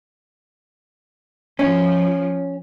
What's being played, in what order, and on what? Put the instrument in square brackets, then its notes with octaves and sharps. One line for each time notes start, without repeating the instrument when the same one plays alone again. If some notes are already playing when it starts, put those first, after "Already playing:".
[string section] F3 [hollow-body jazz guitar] C#4